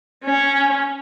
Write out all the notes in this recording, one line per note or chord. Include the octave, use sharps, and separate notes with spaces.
C#4